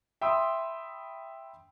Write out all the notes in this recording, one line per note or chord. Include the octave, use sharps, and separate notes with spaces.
E5 G5 B5 C6 D#6 E6